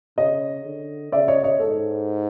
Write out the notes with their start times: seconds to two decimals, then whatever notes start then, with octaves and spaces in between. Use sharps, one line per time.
0.18 C#3 C#5 D#5
0.65 D3
1.12 C#3 D5 E5
1.28 C#5 D#5
1.43 C#5 D#5
1.60 G#2 A4